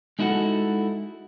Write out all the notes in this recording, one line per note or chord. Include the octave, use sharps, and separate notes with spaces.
G#3 D#4 E4 F#4 A4 F#5